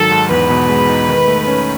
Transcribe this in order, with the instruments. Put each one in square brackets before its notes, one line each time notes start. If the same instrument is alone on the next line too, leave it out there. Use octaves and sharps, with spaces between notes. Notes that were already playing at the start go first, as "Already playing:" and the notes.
Already playing: [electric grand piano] G#2 D#3 F#3 [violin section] A4
[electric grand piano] G#2
[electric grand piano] E2 [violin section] B4
[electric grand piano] B2
G#3
D#4
D#3
A3
C#4